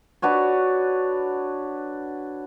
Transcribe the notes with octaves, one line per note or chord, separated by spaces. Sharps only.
D4 F#4 B4 C#5